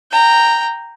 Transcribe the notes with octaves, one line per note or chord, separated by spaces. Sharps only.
G5 A#5